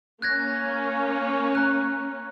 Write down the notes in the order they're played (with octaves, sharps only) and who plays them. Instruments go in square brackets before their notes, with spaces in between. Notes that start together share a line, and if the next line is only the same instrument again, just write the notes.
[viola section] A#3 C#4 [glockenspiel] F#6 G#6 A#6
[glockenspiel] A#5 F#6